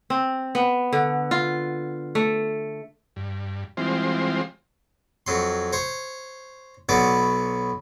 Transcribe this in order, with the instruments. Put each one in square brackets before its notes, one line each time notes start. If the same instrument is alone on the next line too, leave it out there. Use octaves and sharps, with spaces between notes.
[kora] C4
B3
D3
F4
A3
[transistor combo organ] G2
E3 G3 G#3 C4 F4 C5
[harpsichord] F2 F#3 C6
C5 C#5
B1 F#3 B3 D5